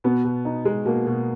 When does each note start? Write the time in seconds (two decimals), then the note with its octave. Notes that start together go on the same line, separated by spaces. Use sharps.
0.04 B2 B3
0.25 B2
0.45 D#4
0.65 G#3
0.86 B2 A#3
1.07 B2